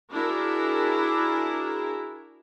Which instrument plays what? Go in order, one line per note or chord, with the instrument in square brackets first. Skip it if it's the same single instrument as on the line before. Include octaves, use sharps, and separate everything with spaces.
[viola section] D4 E4 F#4 G#4 A#4